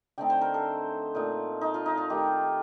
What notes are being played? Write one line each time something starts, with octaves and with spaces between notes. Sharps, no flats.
D3 A3 C4 D#4 G5
C5
A#4
A4
A#2 A3 D#4
D#4
F4
D#4
F4
D#3 A3 D#4 G4